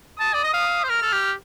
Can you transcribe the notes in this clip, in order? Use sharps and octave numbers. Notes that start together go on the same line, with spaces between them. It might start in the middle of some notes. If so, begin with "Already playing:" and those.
A5 D#6
D5
D#5
F5
C5
A#4 F6
A4
G4